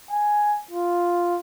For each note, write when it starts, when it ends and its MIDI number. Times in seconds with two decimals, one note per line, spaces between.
0.11 0.60 80
0.71 1.39 65